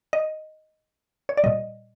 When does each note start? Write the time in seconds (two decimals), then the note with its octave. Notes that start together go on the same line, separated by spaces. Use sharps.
0.13 D#5
1.29 C#5
1.37 D5
1.44 A#2 G3 D#5